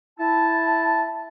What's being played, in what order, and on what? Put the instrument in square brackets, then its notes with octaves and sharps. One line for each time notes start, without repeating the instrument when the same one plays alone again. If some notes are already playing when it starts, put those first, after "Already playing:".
[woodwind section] E4 A5